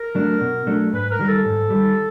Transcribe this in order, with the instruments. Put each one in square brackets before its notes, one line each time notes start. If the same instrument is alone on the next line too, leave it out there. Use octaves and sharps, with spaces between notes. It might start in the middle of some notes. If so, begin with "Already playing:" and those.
Already playing: [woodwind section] A#4
[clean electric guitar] F#3 A3 D4
B2
F#3 A3 D4
[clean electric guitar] G#2 [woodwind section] B4
[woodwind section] A#4
[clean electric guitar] D#3 G3
[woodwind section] A4
[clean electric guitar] G#2
D#3 G3